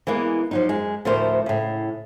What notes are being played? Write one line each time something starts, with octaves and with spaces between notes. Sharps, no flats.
E3 G#3 A#3 B3
F3 F#3 D#4
F#2 G#3
D2 A2 F3 A3 A#4 C5
A2 C#3